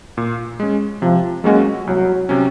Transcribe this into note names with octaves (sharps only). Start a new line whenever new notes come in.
A#2
G#3 C#4
C3 F3
F#3 G#3 A#3 C#4 F#4
C2 F#3
C3 F#3 C#4